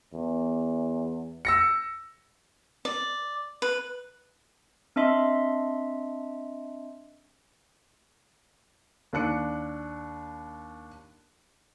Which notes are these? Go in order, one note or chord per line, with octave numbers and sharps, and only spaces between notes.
E2
E6 A#6 C#7
D5
B4
C4 D4 D#5 E5 C6
D#2 D4 F#6 C#7